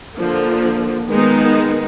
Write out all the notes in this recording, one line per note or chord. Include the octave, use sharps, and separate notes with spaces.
D3 F3 A#3
D#3 G#3 B3 D#4